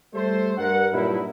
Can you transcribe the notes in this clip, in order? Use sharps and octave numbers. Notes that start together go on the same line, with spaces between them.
G3 A3 C5
G2 A#4 F#5
G2 A#2 F#3 D#4 E4